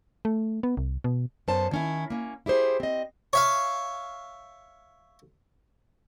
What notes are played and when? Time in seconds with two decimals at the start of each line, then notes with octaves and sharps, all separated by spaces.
0.25 A3
0.63 B3
0.77 C2
1.04 B2
1.48 F#2 B3 C#4 C5 A5
1.71 D#3 C#4 E4
2.10 A#3 C#4
2.46 E4 G4 G#4 C5
2.80 C4 D#5
3.33 C#5 E5 F5